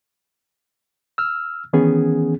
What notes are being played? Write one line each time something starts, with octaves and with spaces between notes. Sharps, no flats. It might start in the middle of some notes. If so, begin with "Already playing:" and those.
E6 F6
D#3 E3 B3 C#4 G#4